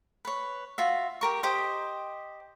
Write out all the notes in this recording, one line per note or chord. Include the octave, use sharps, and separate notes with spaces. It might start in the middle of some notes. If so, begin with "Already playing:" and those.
B4 C#5
F4 F#4 E5
G4 A#4 C#6
G4 C5 D#5